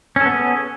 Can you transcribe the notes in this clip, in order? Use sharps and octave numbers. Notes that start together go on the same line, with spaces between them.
B3 C#4 G#4 A4